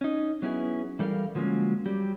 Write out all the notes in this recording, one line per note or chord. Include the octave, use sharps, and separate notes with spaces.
C#4 D#4
F#3 B3 C#4 E4 G#4
E3 G3 A4 A#4 F5
D3 F3 F#3 G#3 A#3 C#4
F#3 G3 G4